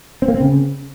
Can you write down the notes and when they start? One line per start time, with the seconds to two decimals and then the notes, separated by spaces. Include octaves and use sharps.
0.22 C4
0.28 A#3
0.34 C4
0.41 C#3